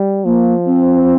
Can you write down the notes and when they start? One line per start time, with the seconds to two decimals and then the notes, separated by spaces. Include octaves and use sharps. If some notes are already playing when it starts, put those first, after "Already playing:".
Already playing: G3
0.25 F3 A#3
0.66 C4